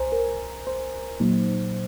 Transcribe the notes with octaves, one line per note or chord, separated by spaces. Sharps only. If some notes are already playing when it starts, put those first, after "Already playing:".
Already playing: C2 C5 G#5 A#5
A#4
C5
A#2 F#3 A#3 D#4